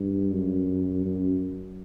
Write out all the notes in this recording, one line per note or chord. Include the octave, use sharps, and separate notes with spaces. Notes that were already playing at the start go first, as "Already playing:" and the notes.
Already playing: G2
F#2
F#2